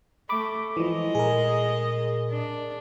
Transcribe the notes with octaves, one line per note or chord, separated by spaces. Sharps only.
A3 B5 D6
E3 F3 G#3 D#5
A#2 G#4 A#4
D4